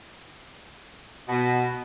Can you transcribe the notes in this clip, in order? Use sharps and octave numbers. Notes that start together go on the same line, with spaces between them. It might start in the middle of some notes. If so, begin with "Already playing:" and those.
B2